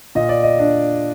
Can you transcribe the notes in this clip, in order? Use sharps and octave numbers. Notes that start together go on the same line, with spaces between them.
A#2 D#5
D5
D#5
D4